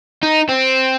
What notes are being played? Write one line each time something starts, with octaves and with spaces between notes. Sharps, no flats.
D#4
C4